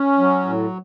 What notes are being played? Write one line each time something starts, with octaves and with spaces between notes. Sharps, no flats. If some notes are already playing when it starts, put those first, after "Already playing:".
Already playing: C#4
F#3
A2